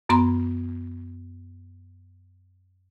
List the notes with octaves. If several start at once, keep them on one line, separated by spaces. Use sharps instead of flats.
F#2 B3 A#5 C6